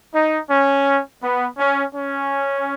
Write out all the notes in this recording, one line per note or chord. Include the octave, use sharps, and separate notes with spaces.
D#4
C#4
B3
C#4
C#4